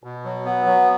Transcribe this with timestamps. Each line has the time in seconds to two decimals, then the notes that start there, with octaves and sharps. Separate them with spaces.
0.04 B2
0.25 F#3
0.45 B3
0.66 F#3